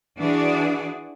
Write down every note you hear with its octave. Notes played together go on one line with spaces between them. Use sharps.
E3 D4 F#4 G#4 D5